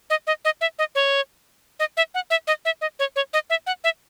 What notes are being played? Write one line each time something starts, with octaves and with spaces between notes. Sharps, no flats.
D#5
D#5
D#5
E5
D#5
C#5
D#5
E5
F#5
E5
D#5
E5
D#5
C#5
C#5
D#5
E5
F#5
E5